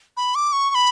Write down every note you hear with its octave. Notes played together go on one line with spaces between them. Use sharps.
B5
D6
C#6
C#6
B5